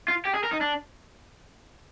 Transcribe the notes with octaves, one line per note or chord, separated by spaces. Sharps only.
F4
G4
G#4
A#4
D#4
D4